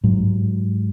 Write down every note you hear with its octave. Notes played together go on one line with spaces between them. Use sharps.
G#2 F#3